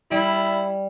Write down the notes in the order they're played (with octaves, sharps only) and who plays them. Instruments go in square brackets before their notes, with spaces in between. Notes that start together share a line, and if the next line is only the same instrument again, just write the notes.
[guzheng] G3 [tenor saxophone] E4